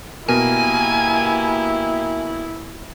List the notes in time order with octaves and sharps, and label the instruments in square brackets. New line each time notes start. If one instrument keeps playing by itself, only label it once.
[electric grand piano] B2 A#4 [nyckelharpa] A#3 G4 [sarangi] E4 [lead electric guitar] G#5